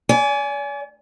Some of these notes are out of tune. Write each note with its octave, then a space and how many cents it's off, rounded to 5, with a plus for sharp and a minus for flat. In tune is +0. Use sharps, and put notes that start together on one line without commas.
D5 -40 G#5 +10